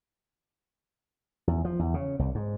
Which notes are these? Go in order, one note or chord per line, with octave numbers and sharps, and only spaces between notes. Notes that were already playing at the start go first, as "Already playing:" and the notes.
E2
F3
E2
C#3
C2
G#2